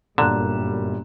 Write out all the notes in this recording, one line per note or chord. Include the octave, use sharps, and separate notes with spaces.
G1 F#2 A#2 D3 G3 A#5 F#6 E7